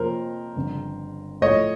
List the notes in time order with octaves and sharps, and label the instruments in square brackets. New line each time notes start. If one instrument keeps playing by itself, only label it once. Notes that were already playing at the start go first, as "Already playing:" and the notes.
Already playing: [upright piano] F2 C3 F3 A#3 C#4 [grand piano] A#4 C5
[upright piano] G1 F2 C#3
[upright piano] A2 F3 A3 [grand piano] C#5 D#5